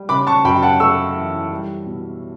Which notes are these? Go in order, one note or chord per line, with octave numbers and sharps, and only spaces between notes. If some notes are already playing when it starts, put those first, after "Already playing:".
Already playing: G3
C#3 B5 D6
A5 C#6
F#2 G5 B5
F#5 A5
A3 C#6 E6
E3
G3
B2